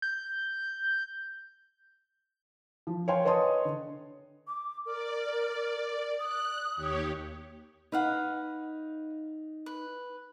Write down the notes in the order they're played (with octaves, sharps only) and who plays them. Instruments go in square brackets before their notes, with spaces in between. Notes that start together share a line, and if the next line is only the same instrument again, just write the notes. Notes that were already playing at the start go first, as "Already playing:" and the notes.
[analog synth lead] G6
[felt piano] F3
C#5 F5 G5 G#5 C6
B4 C#5 D#5 A5 C6 D#6
D3
[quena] D6
[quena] A#4 [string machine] D5
[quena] D#6 [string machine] F#6
[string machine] D#2 G4 C#5
[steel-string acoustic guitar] D#4 [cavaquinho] B4 F5 F#5
[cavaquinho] B4